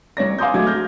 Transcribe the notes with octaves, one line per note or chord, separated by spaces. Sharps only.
C2 C#5 D5 A#6
F5 G#5 C6 D6 D#6 G6
F#3 G#3 A3 D6 G#6
F6 G6 A#6